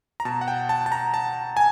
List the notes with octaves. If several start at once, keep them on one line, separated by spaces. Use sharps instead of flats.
A#5
B2 A5
F#5
G5
A5
A5
A#5
A5
G#5